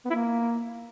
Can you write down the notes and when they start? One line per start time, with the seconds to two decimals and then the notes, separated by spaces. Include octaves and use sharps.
0.05 B3
0.10 E4
0.15 A#3